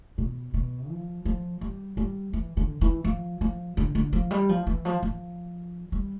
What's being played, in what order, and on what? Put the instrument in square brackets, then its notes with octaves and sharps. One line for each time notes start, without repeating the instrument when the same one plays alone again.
[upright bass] B2
B2
F3
F3
G3
G3
E3
D3
E3
F3
F3
D3
D3
F3
G3
F3
E3
F3
F3
G3